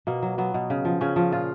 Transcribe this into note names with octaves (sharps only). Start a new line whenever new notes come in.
B2 A#3
F#3
F#3 B3
B2
C#3
F3
C#3 C#4
F3
A#2 F4